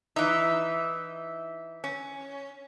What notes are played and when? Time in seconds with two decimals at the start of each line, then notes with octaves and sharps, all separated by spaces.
0.16 E3 D#4 E5
1.84 C#4